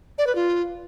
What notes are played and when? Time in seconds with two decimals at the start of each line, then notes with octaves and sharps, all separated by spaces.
0.18 D5
0.27 B4
0.35 F4